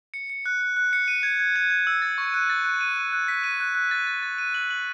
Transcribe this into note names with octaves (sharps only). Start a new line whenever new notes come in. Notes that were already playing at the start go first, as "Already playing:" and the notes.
C#7
C#7
F#6
F#6
F#6
C#7
D#7
G#6
G#6
G#6
G#6
E6
A6
C#6
F#6
A6
F#6
D#7
D#7
F#6
B6
D#7
F#6
F#6
A6
A6
A6
D#7
F#7
F#7